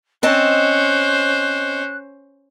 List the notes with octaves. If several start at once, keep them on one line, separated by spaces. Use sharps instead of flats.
C4 C#4 C5 D#5 A5 F#6